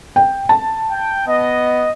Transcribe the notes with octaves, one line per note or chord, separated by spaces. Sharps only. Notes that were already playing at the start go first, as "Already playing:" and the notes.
G5
A5
G5
B3 D#5